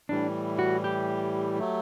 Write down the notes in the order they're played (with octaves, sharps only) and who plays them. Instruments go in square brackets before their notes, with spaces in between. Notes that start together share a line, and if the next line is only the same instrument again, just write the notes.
[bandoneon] A2 E3 G3 [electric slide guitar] D4
[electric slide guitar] F#4
G4
[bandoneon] F#3 A3